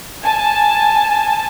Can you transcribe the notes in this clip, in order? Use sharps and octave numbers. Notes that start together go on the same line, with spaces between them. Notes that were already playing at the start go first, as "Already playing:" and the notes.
G#5 A5